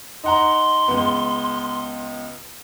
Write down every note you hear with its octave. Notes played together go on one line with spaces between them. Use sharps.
D#4 F#5 A#5 C6
C#2 B3